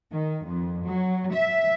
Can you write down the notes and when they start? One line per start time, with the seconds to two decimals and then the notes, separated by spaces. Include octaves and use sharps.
0.12 D#3
0.46 F2
0.86 F#3
1.33 E5